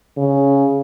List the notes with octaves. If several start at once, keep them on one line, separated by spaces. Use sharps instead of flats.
C#3